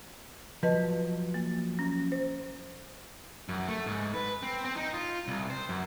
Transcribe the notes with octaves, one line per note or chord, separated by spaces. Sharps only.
F3 F#3 B4 D#5 A5
A#3
C#4
C5
F#2
A3
G#2
B4
C4
C4
D#4
F4
C2
C5
F#2